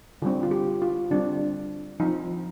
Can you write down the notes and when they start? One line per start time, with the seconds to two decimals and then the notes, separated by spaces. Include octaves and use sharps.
0.22 D3 G3 C4 F4
0.43 F4
0.51 G4
0.82 F4
1.11 D3 G3 C4 D4
2.00 F3 C4 D#4